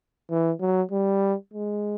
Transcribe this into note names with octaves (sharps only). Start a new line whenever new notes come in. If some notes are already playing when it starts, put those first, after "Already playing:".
E3
F#3
G3
G#3